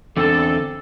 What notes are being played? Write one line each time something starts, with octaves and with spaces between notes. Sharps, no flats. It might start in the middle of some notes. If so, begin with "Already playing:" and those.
E2 D3 C4 A4